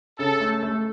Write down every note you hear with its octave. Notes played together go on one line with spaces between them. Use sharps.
C#3 A4
A3
A3